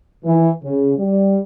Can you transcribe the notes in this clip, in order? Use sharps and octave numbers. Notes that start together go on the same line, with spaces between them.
E3
C#3
G3